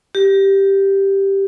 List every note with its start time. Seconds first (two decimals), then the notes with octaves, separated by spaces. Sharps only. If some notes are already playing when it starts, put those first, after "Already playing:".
0.15 G4